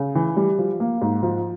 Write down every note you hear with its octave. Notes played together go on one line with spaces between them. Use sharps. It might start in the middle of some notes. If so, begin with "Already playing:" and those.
Already playing: C#3
E3
G3
F3
A#3
G#2
F3